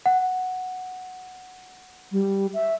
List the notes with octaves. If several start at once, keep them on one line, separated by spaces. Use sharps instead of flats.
F#5
G3
E5